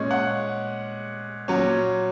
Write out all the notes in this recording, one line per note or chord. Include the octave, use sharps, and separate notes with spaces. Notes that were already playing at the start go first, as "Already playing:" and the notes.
Already playing: A#2 G#3 C#4
F#5
A#2 F#3 C#4